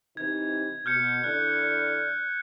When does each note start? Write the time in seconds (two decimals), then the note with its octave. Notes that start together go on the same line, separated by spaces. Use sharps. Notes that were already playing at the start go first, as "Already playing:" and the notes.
0.17 C3 E3 D#4 G#6
0.86 B2 F6 G6 C#7
1.24 D3 E4 D5 F#6